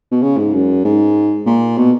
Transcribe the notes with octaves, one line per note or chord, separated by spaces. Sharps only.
B2
C#3
G#2
F#2
G#2
A#2
B2